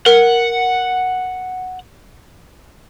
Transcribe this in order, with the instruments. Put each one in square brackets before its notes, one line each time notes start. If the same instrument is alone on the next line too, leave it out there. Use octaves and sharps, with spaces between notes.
[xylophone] A#4 [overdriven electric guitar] F#5